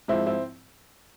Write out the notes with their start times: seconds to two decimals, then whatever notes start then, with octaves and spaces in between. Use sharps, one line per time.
0.08 G#2 F3 C4 E4
0.26 C4 E4